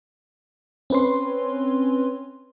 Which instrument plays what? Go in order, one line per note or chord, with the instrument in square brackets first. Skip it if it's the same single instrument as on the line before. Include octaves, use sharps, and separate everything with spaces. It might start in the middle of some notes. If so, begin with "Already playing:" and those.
[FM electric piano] C4 C#4 B4 C#5 C6